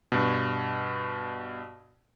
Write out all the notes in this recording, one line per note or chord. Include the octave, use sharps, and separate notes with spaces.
G2 B2